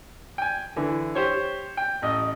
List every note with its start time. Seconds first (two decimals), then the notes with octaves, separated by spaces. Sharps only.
0.38 G5 G#5
0.76 D3 E3
1.15 G4 C5 C#5
1.77 G5
2.02 A1 D#5